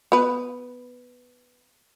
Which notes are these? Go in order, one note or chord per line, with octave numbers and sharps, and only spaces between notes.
B3 B4